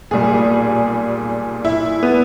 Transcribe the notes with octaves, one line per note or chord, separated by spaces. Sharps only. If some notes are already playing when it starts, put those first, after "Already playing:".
B1 A#2 G3 G#4
E4
B3